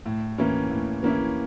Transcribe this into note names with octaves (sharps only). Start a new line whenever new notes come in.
A2
E3 A#3 C#4 E4
A2
E3 A#3 C#4 E4